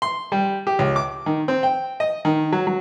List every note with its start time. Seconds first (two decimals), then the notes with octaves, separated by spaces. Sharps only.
0.02 C6
0.32 G3
0.67 G4
0.79 C#2
0.96 D6
1.26 D#3
1.48 C4
1.63 G5
2.00 D#5
2.25 D#3
2.53 F#3
2.67 F#3